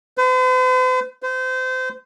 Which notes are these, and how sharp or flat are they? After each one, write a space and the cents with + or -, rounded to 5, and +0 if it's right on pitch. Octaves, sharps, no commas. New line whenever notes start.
C5 -45
C5 -30